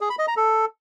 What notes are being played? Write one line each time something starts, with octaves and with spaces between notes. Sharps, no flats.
G#4
B5
D#5
A#5
A4